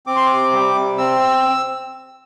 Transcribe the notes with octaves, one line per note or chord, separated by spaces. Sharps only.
C4 D6
C6
C3 D6
G3
C3
C4 E6